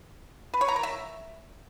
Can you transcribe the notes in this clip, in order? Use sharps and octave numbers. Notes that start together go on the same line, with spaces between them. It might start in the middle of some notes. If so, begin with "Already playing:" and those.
B4
C#5
A#5
A#4
E5